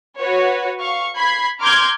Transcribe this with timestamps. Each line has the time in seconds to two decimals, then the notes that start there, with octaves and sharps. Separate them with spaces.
0.16 F#4 B4 C#5
0.79 F5 C#6
1.15 B5 G#6 C7
1.61 A#5 C6 D6 F6 G6 G#6